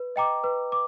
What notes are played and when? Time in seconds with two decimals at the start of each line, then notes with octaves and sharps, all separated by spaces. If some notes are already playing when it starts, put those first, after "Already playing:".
Already playing: B4
0.16 D#5 G5 A#5 D6
0.44 B4
0.72 D6